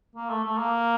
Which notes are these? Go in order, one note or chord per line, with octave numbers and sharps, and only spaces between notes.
A#3
A3
A3
A#3